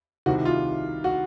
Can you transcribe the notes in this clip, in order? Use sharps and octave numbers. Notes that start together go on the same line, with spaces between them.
C2 C3 D#3 F#4
F4
F#4